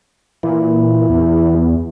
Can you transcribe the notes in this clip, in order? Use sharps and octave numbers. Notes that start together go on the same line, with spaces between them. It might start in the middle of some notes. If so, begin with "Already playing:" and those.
A#2 E3 E4
E2